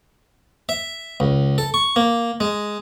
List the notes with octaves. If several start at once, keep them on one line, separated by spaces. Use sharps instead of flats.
E5
C#2
A4
C#6
A#3
G#3